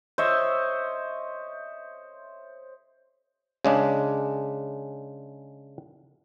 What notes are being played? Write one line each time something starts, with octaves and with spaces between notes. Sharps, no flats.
C5 C#5 D#5 E5
C#3 G#3 D4